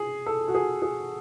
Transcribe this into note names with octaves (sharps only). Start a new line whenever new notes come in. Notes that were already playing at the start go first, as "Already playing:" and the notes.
Already playing: G#4
A4
F#4
G#4
G#4